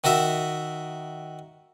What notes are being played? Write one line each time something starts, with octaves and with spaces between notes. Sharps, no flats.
D#3 F#4 A#4 E5